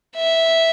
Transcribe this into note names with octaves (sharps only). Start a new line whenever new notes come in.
E5